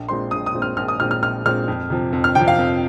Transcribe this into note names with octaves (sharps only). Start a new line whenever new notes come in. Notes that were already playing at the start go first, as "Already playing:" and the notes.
Already playing: A#1
A#2 G#3 C4 C6
A#1 D#6
D#6
A#2 G#3 C4
F6
A#1 F6
D#6
A#2 G#3 C4 F6
F6
A#1 F6
A#2 G#3 C4 F6
F2
C3 F3
F2
F6
C3 G5
F3
F5
F2